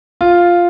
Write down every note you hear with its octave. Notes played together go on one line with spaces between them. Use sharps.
F4